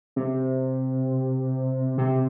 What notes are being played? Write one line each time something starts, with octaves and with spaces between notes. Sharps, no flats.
C3
C3